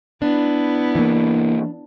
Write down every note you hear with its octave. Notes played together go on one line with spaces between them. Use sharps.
B3 D4 E4
E3 A#3